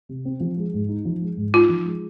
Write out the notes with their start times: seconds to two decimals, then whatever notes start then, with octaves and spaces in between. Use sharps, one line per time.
0.09 C3
0.25 C4
0.40 F3
0.57 G#3
0.74 G#2
0.89 D#4
1.05 F3
1.22 G#3
1.37 G#2
1.54 D#4 F4
1.69 F3
1.85 G#3